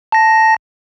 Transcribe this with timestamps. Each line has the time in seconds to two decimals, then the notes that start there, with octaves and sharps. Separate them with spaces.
0.12 A5 A#6